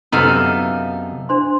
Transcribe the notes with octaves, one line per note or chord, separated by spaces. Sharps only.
F#2 C3 B3 D#4 A4 F5
D4 C5 C6